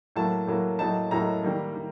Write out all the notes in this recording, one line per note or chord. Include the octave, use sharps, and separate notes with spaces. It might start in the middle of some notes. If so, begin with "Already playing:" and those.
A2 F#3 A#3 A5
A2 F#3 A#3
A2 F#3 A#3 D#4 A5
A2 F#3 A#3 D#4 A#5
D#3 G3 A#3
D#3